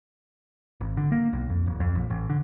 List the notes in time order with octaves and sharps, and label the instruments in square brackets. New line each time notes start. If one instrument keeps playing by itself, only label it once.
[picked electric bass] G#1
D3
A#3
B1
F2
D1
F2
A#1
A1
D3